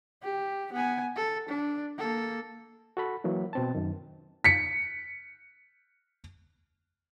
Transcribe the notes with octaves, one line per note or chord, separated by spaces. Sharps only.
G4
B3 G#5
A4
D4
A#3 A4
F#4 A4 B5
E3 F#3 A#3
B2 C4 A5
F#2 D#3
B6 C#7